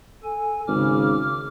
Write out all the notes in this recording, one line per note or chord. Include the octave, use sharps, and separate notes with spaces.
A4 G#5
G#1 C#3 D6 F6